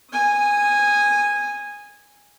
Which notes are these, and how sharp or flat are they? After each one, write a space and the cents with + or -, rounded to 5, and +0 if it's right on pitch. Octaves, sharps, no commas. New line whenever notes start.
G#5 -15 D#6 +0